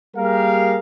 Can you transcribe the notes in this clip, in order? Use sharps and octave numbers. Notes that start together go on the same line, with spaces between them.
G3 A#3 G4 G#4 A#4 F5